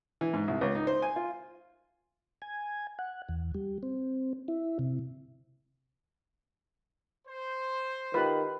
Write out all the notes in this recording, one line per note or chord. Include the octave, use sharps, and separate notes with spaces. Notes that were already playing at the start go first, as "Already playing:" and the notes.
E3
G#2
C2
C#2
D#4
C5
G#5
F4
G#5
F#5
E2
G3
C4
E4
C3
C5
D#3 F4 G4 B4